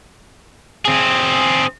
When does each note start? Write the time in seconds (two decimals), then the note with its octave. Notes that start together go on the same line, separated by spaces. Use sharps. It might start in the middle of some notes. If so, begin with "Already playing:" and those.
0.85 C4 G#4